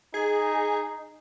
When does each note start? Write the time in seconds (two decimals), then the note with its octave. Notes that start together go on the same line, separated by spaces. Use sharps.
0.14 D#4 G#4